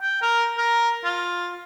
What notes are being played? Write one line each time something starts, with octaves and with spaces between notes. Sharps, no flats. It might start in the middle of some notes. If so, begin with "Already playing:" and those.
G5
A#4
A#4
F4